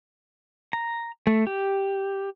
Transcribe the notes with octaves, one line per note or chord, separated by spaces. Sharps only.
A#5
A3
G4